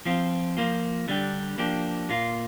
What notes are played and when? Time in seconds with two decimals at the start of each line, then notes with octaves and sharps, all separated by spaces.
0.05 F3 C4 F4
0.57 F3 A#3 F4
1.08 D3 G3 D4 G4
1.58 F3 A#3 D4 G4
2.09 A#2 A#3 F4